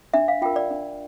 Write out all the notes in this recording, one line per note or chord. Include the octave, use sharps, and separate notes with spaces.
D4 E5
F5
F4 A#4 G5
D5
D4